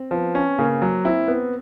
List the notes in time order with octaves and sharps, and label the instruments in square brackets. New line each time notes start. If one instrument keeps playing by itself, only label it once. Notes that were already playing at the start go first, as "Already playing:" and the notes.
Already playing: [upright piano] C4
[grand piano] F3 [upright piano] B3
[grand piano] C#4
[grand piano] C#3 [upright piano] A#3
[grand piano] F#3
[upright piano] C4 [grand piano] E4
[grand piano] B3